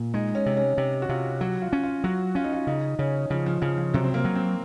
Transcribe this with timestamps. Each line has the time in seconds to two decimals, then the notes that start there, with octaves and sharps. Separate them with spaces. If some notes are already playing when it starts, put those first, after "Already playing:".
Already playing: A#2
0.14 G#3 D#4
0.35 C#4
0.46 C3
0.57 C#4
0.78 C3
1.02 F#4
1.09 C3 F4
1.41 F#3 F#4
1.62 F4
1.73 C#4
1.83 F4
2.04 F#3 F#4
2.35 C#4 F4
2.44 D#4
2.53 F4
2.67 C#3 D#4
2.99 C#3 C#4
3.30 C#3 F3
3.46 F3
3.62 C#3 F3
3.78 F3
3.94 C3 F#3
4.04 C4
4.14 A#3
4.25 F#3
4.35 C4